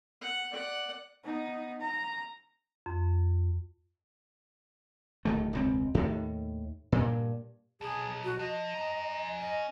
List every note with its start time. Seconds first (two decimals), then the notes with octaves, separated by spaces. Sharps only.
0.21 F#5
0.51 D5 F#5
1.24 B3 D#4
1.81 A#5
2.86 F2
5.25 D1 D#3 A3
5.53 E1 C#2 C4
5.95 D#2 A2 D#3
6.92 G2 A#2
7.81 B1 G#4
8.25 F#4
8.39 F3 D#5
8.74 C#4 A#5
9.40 D#5